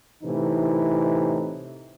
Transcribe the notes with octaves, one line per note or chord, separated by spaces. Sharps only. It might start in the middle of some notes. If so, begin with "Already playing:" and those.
A2 C3 E3 D#4